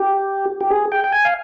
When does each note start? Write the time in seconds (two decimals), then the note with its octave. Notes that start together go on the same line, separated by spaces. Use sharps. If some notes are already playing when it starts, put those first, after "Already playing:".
Already playing: G4
0.61 G4
0.71 G#4
0.92 G5
1.04 G5
1.13 G#5
1.25 F5